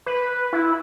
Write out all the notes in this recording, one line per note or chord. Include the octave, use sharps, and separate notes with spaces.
B4
E4